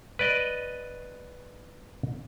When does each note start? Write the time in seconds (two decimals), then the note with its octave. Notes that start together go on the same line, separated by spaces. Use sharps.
0.19 B4 D5 D#5